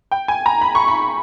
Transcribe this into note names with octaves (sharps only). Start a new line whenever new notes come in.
G5
G#5
A#5
B5
C#6
B5